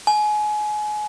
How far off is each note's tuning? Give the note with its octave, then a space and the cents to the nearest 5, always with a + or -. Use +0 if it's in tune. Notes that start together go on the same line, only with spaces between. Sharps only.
G#5 +30